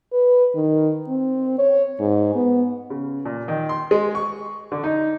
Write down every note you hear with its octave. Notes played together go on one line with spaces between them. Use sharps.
B4
D#3
C4
C#5
G#2
B3
C#3
A#2
D#3
C6
G#3
C#6
D3
D#4